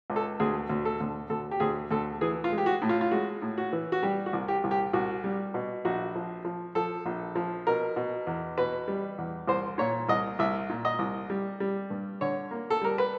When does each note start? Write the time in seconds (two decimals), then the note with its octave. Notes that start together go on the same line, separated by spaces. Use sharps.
0.10 C#2
0.16 A4
0.40 D2 G#4
0.69 D2
0.85 A4
1.00 D2
1.30 D2 A4
1.51 G4
1.60 D2 G#4
1.91 D2 A4
2.21 E3 G#4
2.44 F4
2.52 G#3
2.58 G4
2.66 F#4
2.82 A2
2.89 F4
3.01 F4
3.11 G#3 F#4
3.42 A2
3.58 F#4
3.73 E3
3.92 F#4
4.03 G3 G4
4.26 F#4
4.33 C2
4.48 G4
4.64 C2
4.71 G4
4.93 C2 F#4
5.24 G3
5.54 B2
5.85 A#1 F#4
6.15 F3
6.45 F3
6.75 F3 A4
7.06 A#1
7.35 F3
7.67 B2 A#4
7.96 B2
8.27 E2
8.58 B2 B4
8.88 G3
9.18 E2
9.48 C2 C5
9.78 A#2 C#5
10.09 C2 D#5
10.39 C2 E5
10.70 A#2
10.85 D#5
10.99 C2
11.30 G3
11.60 G3
11.90 G2
12.21 D3 C#5
12.51 A#3
12.70 A4
12.81 G3 A#4
12.98 B4